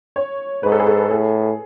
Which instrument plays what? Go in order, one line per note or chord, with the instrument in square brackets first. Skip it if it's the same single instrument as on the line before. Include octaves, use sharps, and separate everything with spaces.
[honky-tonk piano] C#5
[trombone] G#2 [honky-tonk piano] B4
[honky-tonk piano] A4
G#4
A4
[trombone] A2 [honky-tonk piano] G#4